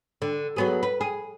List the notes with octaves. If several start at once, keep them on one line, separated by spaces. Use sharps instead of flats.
D3
F#3 B3 G#4
B4
G#4